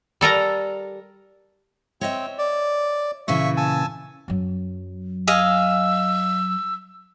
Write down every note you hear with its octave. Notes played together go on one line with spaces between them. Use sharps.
G3 A4 A#4 A#5
C4 C#5 D#5 E5
D5
A#2 C#3 E3 E5 C#6
G#5 A5 E6
F#2 F#3
D#5 F5 G#5 E6